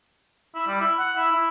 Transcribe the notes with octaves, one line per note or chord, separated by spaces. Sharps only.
E4
G3
E4
F#5
E4
E4